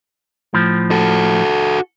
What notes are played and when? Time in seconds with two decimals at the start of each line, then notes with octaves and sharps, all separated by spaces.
0.54 A2 F3
0.91 F#4 A4